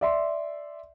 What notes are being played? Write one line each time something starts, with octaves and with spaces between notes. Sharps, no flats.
D5 E5 C6